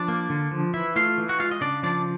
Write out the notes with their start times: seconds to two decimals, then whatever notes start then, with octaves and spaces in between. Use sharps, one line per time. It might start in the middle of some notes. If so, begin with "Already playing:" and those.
Already playing: F3 D4 D5
0.08 A#3
0.30 D3
0.51 F3
0.74 E3 E4 E5
0.96 A3 F4 F5
1.18 E3
1.29 F#4 F#5
1.40 G#3 F4 F5
1.51 D#5
1.61 C#3 D4 D5
1.83 F3 D4 D5